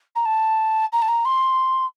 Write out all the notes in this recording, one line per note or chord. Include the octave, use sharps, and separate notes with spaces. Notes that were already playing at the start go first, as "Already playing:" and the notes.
A#5
A5
A#5
A5
A#5
C6